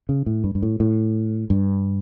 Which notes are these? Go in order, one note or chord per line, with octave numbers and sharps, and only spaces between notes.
C#3
A2
G2
G2
A2
A2
G2